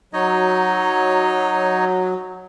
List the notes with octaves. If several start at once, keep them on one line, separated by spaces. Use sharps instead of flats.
F#3 D#4 C#5 D#5